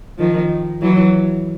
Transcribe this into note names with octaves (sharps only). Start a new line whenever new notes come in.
D#3 F3
E3 F#3